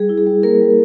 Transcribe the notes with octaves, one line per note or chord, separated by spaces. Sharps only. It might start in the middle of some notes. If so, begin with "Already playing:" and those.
Already playing: G3 G#4
E4
G#4
G3
A#3 A#4
G3